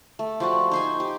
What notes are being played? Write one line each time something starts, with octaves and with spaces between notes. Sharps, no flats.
A3
F3 G3 F#4 C6 C#6
D#4 C5 G#5
G4